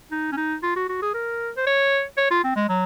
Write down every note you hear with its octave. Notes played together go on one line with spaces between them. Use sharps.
D#4
C#4
D#4
F4
F#4
F#4
G#4
A#4
C5
C#5
C#5
F4
C4
G#3
F#3